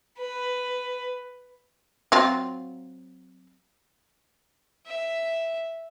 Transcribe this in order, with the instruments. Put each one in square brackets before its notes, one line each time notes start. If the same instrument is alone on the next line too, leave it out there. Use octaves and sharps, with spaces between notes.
[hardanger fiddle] B4
[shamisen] F#3 C4 F4
[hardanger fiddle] E5